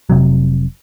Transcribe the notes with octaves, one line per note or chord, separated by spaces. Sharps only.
F1 C3 F#3